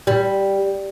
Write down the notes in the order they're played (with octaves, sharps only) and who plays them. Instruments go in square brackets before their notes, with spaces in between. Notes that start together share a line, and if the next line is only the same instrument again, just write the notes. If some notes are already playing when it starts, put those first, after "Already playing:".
[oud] G3